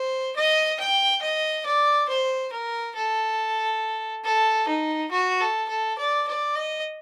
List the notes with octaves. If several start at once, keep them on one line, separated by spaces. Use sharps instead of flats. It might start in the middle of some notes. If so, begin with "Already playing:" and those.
Already playing: C5
D#5
G5
D#5
D5
C5
A#4
A4
A4
D#4
F#4
A4
A4
D5
D5
D#5